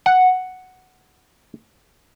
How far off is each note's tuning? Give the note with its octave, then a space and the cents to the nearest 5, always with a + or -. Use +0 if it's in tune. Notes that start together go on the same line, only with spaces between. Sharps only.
F#5 +0